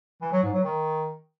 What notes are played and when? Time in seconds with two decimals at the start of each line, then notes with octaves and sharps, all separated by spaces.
0.22 E3
0.32 F#3
0.43 G#2
0.53 F#3
0.64 D#3